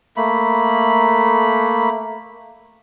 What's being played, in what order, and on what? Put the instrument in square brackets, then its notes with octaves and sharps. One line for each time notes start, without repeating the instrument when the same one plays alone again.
[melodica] A3 A#3 B5